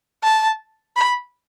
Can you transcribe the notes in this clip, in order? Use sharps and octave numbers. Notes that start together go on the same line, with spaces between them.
A5
B5